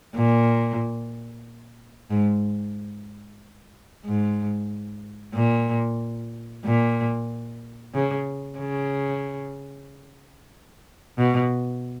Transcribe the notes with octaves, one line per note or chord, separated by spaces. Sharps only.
A#2
G#2
G#2
A#2
A#2
C#3
C#3
B2